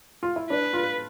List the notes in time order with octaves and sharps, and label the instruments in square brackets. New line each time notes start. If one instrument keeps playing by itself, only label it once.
[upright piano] F4
E4
[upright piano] D4 [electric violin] B4
[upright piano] F4